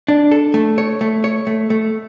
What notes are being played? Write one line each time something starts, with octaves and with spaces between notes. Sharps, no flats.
D4
A4
A3
C#5
A3
C#5
A3
A3